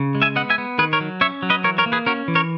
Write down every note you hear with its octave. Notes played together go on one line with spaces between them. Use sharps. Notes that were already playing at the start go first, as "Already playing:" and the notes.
Already playing: C#3
G#3
E5 G#5
B3 D#5 F#5
E5 G#5
B3
D#3 G#4 B4
A#4 C#5
F#3
C#4 C#5 E5
F#3
B4 D#5
E3 A#4 C#5
A#4 C#5
A#3
G#4 B4
C#4 F#4 A#4
E3
A#4 C#5